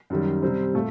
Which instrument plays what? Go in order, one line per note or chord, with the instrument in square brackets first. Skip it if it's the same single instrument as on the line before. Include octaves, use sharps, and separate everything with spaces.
[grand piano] F#2 D#3 G3
C3 G3 C4
A#2 A3